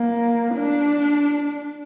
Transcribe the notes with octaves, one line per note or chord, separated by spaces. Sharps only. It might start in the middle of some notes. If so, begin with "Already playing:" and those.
Already playing: A#3
D4